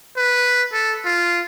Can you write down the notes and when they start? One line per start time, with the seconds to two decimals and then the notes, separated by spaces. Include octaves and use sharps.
0.17 B4
0.73 A4
1.05 F4